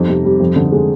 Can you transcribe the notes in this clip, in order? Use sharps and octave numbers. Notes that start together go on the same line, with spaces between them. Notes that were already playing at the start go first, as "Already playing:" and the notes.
Already playing: F2 G3 D#4
C3
G3
F2
D3
G#3